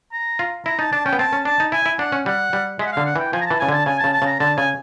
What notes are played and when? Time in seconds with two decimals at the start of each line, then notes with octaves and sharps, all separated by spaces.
0.13 A#5
0.39 F4
0.66 E4 A#5
0.79 D#4 A5
0.92 D4 A5
1.05 C#4 G5
1.13 B3
1.19 C4 A5
1.33 C#4
1.45 D4 A5
1.60 D#4
1.72 E4 G#5
1.86 E4
1.99 D4 F#5
2.12 C#4
2.26 G3 F#5
2.53 G3
2.79 G#3 E5
2.86 F#5
2.92 F5
2.97 D3
3.06 F#5
3.16 E3 G5
3.32 F3 G#5
3.41 A#5
3.46 E3 A5
3.60 C#3 G#5
3.69 D3 A5
3.86 C#3 G#5
3.99 A5
4.04 C#3
4.13 A5
4.22 C#3 A#5
4.40 D3 A5
4.57 C#3 G#5